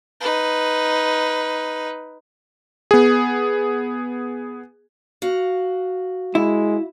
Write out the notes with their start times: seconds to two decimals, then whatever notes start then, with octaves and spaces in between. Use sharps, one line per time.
0.20 D#4 B4
2.91 B3 G#4
5.22 F#4 F5
6.35 G#3 E4